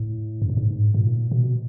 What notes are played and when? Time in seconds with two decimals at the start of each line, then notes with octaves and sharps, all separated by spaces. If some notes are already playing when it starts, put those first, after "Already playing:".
Already playing: A2
0.42 F#2
0.50 G2
0.57 G#2
0.94 A#2
1.31 B2